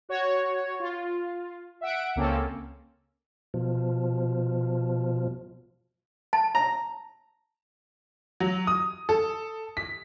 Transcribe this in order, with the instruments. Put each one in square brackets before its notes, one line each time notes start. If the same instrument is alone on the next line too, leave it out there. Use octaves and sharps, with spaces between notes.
[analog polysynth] F#4 C#5
F4
E5 F#5 D7
C#2 A#3 C4 C#4 A4
[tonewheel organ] B2 F3
[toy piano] A5
[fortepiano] A#5
[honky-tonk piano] F#3
D#6
A4
B6